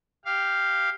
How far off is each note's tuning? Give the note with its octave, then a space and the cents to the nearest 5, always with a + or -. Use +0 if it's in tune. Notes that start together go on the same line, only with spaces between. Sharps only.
G4 +0 F5 -5